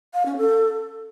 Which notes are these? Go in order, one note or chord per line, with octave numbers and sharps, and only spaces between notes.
F5
C#4
A4